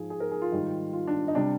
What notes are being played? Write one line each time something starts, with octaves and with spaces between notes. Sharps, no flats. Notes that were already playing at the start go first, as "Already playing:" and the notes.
Already playing: G#2 F3 G#4
G#4
A#4
G#4
F4
G#2 D#3 G3
F4
D4
D#4
C3 G3 D4